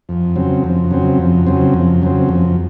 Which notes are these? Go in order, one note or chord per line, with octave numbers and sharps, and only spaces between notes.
F2
C#3 F#3 C4
F2
C#3 F#3 C4
F2
C#3 F#3 C4
F2
C#3 F#3 C4
F2